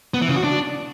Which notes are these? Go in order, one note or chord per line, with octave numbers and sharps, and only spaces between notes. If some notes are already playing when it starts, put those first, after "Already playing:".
B3
E3
C#3
F#4
D4